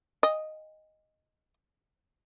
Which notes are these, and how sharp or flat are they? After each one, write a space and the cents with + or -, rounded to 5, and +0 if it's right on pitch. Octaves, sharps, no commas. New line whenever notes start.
D#5 +0 G#5 -45